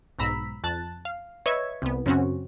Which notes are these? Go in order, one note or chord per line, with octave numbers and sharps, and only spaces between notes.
B1 G#2 A#5 B5 E6 B6
F2 A5 F#6 A6
F5
B4 C#5 D#5 E5 C#6 G#6
C2 B3
F#2 C#3 C4 C#4 F#4